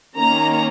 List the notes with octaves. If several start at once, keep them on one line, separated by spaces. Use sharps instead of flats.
D#3 A#3 C#4 A#5